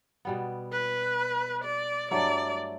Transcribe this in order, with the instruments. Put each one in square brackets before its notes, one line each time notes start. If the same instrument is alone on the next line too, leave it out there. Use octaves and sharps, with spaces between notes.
[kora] B2 G3 B3
[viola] B4
D5
[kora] G2 F#3 A3 E4 [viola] D5